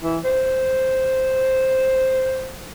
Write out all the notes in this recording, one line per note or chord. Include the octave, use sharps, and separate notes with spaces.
E3
C5